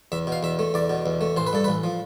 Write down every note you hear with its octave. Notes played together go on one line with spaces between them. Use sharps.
E2 E5
B2 F5
E2 E5
A3
E2 D5
B2
E2
A3
A1 C5
B4
G2 A4
A1 B4
F3